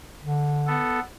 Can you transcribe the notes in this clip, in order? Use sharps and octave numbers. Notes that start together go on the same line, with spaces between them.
D3
B3 A4